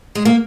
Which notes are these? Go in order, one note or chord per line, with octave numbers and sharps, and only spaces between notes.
G#3
A#3